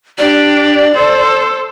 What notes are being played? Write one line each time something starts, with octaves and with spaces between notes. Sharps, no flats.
D4 G4 D5
A4 C5